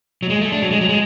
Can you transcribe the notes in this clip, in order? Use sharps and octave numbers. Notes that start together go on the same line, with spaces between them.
F#3
G#3
A3
D4
F#3
G#3
F#3
G#3